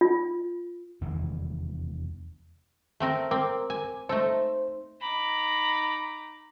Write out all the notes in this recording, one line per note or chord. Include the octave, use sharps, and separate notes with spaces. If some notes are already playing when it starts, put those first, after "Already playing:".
F4
F1 E2 D#3 E3
A3 C4 A#4
C4 A#4 D6
G#5
A3 D#4 A4 C5
D#4 A#5 B5 D6